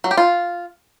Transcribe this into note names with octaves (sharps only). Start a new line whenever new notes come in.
F#3
G4
F4